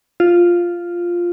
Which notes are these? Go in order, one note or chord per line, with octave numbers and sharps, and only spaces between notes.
F4